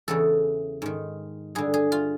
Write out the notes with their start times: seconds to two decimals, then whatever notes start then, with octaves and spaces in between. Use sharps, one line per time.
0.08 E2 C#3 E3 A4
0.82 G#2 D#3
1.55 G2 D3 G#4
1.74 G#4
1.92 F4